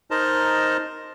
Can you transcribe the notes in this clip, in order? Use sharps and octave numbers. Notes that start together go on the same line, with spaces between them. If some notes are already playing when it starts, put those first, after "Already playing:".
D#4 A#4 C5 D#5 A5 A#5